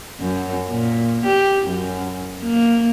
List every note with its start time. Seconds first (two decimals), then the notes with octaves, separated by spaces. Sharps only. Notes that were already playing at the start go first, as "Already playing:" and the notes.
0.20 F#2
0.70 A#2
1.26 G4
1.67 F#2
2.43 A#3